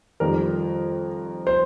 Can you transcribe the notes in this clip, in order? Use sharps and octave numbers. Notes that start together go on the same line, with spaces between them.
F2 D#3 G3 A#4
C5